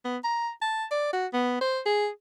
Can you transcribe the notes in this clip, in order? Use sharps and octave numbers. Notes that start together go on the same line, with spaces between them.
B3
A#5
A5
D5
F#4
B3
C5
G#4